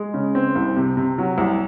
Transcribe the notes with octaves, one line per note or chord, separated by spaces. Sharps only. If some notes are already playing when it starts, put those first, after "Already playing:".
Already playing: G#3
C#3
C4
C2
C3
C3
F#3
C2